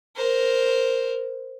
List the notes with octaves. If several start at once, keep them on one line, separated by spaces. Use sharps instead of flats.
A#4 C5